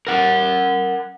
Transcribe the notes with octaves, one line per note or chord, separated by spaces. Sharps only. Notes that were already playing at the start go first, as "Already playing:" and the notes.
A#4 F#5